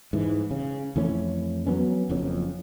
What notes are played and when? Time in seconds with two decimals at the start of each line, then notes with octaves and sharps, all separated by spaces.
0.13 G#2 E3
0.51 C#3
0.96 F2 E3 A3 C#4
1.67 F#3 B3 C#4
2.09 F#1 F2 C#4